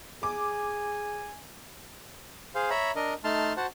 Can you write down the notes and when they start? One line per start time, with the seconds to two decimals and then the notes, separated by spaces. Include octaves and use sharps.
0.23 G#4 G#5 D6
2.55 G#4 C5 F5
2.70 C#5 E5 A#5 B5
2.96 D4 A#4 D#5
3.24 A3 D#4 A5 C6 F6
3.57 F#4 C5 F#5 A5